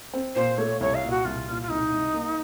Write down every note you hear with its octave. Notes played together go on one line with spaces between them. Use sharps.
C4
A#2 C5
A3 C#5
C2 C#5
F5
A#2
F#4
C2 F4
A#2
F4
C2 D#4
C2
A#3